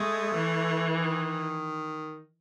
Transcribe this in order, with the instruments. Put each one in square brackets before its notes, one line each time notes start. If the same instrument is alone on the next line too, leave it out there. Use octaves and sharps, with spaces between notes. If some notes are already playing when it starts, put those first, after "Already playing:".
Already playing: [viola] G#3 [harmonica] A3
[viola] E3
[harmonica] D#3